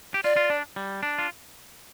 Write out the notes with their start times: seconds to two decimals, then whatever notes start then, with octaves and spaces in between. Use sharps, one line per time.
0.14 G4
0.24 F4 D5
0.36 F4
0.50 D4
0.76 G3
1.03 D4
1.19 F4